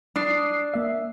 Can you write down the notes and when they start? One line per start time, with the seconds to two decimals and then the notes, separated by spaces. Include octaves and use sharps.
0.16 D4 D6 D#6 C7
0.74 A#3 E5